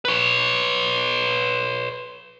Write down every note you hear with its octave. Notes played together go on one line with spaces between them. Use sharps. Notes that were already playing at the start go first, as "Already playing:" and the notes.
B4 C#5